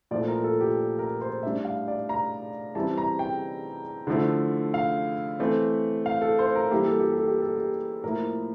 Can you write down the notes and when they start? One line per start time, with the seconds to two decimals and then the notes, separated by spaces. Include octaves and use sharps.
0.11 A#2 F3 A3 E4 D5
0.28 A#4
0.44 A4
0.61 G4
0.99 A#4
1.21 C5
1.43 A2 G3 D4 E5
1.65 F5
1.88 D5
2.09 A#5
2.75 E3 G3 C4 E4 A5
2.98 A#5
3.19 G5
4.07 D3 F3 A3 E4
4.74 F5
5.39 E3 A3 C4
6.06 F5
6.21 A4
6.39 C5
6.55 A#4
6.71 E3 G3 A#3 E4 G4
6.86 A4
7.00 G4
7.13 A4
7.27 G4
7.42 A4
7.56 G4
8.04 A2 F3 A#3 E4 A#4